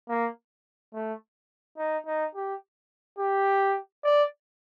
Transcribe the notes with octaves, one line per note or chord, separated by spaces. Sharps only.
A#3
A3
D#4
D#4
G4
G4
D5